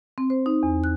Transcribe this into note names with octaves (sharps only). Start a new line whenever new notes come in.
C4
C5
D#4
E2
F#6